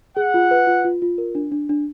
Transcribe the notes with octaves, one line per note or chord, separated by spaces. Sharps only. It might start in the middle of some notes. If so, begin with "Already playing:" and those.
G#4 F#5
F4
B4
F4
F4
F4
A#4
D4
D4
D4